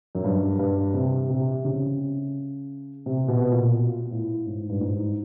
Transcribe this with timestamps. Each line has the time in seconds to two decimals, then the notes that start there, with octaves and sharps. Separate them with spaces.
0.15 F#2
0.24 G2
0.59 G2
0.94 C3
1.30 C3
1.65 C#3
3.06 C3
3.28 B2
3.52 A#2
4.11 A2
4.46 G#2
4.69 G2
4.81 G#2